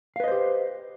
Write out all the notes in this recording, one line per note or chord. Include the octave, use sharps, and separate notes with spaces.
G4 B4 C5 D#5 F5